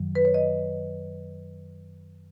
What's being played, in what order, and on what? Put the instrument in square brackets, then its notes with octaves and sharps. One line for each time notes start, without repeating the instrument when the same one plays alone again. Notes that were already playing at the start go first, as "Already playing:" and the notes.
Already playing: [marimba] F#2 D#3 F#3
B4
C#5
D#5